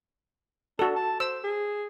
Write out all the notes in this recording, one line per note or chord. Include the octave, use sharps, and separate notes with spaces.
D4 F#4 A4
A5
C5 E6
G#4